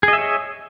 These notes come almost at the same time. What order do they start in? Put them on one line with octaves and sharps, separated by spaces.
G#4 D#5 E5 C#5